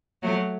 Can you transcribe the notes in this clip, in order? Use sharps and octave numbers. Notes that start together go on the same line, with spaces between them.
F#3 A3